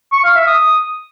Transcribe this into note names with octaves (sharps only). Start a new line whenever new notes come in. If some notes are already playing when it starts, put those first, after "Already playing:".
C#6
F5
E5
D#6